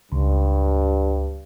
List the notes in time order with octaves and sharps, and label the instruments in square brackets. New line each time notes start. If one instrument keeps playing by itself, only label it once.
[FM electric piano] C#2 [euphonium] G2